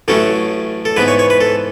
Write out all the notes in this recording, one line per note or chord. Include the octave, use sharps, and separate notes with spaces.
A1 A2 F#3 A3 C#4 A4
A4
G#2 E3 B3 B4
C#5
C#5
B4
A4